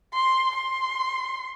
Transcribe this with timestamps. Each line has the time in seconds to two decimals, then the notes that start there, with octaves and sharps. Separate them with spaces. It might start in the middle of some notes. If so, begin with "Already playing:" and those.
0.13 C6
0.55 C6